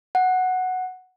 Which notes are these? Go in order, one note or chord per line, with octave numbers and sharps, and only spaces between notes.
F#5